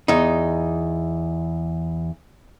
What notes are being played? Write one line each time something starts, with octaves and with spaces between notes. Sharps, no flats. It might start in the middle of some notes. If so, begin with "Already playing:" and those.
E2 D#4